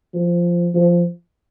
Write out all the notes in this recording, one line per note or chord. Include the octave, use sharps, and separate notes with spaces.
F3
F3